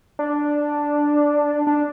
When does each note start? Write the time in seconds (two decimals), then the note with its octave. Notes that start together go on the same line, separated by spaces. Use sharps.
0.19 D4
1.67 D4